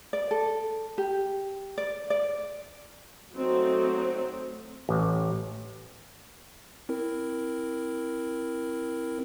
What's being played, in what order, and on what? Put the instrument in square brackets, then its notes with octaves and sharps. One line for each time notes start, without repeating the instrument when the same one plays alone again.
[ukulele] D5
A4
G4
D5
D5
[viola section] F#3 A3 C4 D#4 F#4
[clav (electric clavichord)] A1
[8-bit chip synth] C4 E4 A#4